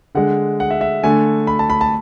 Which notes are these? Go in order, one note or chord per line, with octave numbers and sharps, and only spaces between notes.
D3 G#3 F#5
F#5
E5
E5
D3 A3 G#5
B5
A5
B5
A5